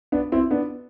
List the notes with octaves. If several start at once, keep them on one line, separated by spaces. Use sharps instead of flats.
B3 D4
C4 E4
B3 D4